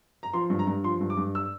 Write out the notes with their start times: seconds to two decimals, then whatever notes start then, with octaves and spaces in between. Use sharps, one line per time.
0.23 A#5
0.33 F3 C6
0.50 G2
0.59 A#5
0.67 G2
0.84 F3 C6
1.01 G2
1.10 D6
1.17 G2
1.35 E6